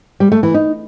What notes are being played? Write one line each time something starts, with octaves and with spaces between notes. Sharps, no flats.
G3
A3
E3
D#4